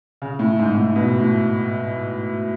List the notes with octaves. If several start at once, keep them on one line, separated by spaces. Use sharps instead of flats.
C#3
A2
G#2
G#2
A2
B2
A2